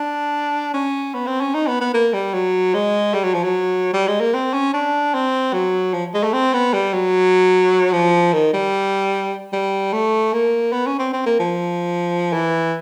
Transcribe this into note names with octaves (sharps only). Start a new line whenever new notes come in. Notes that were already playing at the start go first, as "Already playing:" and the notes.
Already playing: D4
C#4
B3
C4
C#4
D#4
B3
B3
A#3
G3
F#3
G#3
G3
F#3
F3
F#3
G3
G#3
A#3
C4
C#4
D4
C4
F#3
F3
G#3
A3
C4
B3
G3
F#3
F3
D#3
G3
G3
A3
A#3
B3
C#4
C4
C4
A#3
F3
E3